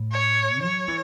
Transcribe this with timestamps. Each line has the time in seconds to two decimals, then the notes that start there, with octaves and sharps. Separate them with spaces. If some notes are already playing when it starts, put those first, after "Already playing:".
Already playing: A2
0.13 C#5
0.62 F#3 C#5
0.88 E3